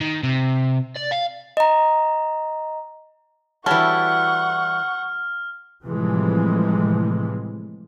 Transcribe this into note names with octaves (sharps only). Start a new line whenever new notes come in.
D#3
C3
D5
F5
D#5 A#5
E3 G3 F#4 A4 C#5 F#5 C#6 F6
A2 C3 E3 F3 G3 G#3